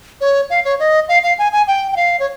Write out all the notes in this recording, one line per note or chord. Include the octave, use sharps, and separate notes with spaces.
C#5
F5
C#5
D#5
F5
F5
G#5
G#5
G5
G5
F5
C#5